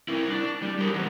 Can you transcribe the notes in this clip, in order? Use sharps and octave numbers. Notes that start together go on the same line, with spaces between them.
E4 A#4
D4
G3
G4 A#4
D#3 F#3